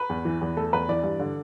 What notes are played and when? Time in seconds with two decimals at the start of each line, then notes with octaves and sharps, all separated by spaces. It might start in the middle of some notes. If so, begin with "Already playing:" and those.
Already playing: B4
0.09 E2
0.25 E3
0.41 E2
0.57 A3 A4
0.73 E2 B4
0.89 E3 D5
1.04 G2
1.20 D3